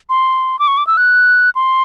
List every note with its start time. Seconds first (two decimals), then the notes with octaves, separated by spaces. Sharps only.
0.09 C6
0.59 D6
0.67 C#6
0.77 D6
0.87 E6
0.97 F#6
1.55 C6